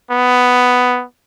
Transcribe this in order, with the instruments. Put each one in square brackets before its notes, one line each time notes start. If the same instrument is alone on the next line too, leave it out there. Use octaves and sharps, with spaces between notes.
[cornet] B3